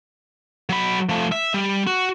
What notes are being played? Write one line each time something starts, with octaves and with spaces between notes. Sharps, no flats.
F#3 B5
F3 A3
E5
G3
F#4